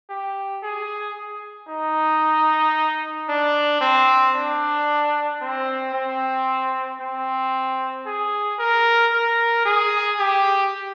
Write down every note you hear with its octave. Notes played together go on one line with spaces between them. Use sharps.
G4
G#4
D#4
D4
C4
D4
C4
C4
C4
G#4
A#4
A#4
G#4
G4